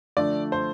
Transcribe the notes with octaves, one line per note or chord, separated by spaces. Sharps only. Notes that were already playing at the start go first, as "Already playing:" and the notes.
D3 F3 A3 D5
C5